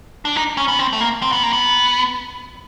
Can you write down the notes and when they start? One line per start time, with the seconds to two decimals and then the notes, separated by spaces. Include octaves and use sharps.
0.25 D4
0.36 D#4
0.58 C#4
0.68 B3
0.79 C4
0.93 A3
1.01 A#3
1.22 C4
1.32 B3
1.43 A#3
1.53 B3